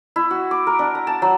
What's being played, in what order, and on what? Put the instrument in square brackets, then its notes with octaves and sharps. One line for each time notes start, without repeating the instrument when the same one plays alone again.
[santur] E4
F#4
D6
A#4
D4
A#5
A5
F#3